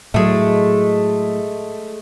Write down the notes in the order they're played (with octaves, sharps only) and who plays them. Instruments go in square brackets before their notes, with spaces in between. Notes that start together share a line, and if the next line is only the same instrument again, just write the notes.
[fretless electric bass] A2 F#3 [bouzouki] G#3 A3